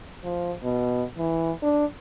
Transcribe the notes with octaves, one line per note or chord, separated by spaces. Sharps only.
F3
B2
E3
D4